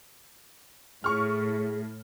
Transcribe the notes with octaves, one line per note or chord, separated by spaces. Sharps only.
A2 G#4 C#6 F6